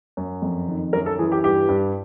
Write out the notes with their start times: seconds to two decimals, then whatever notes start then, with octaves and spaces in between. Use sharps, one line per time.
0.17 F#2
0.42 F2
0.68 D#3
0.93 F#2 A#4
1.06 A4
1.19 E3 G#4
1.32 G4
1.44 G2 G4
1.69 G2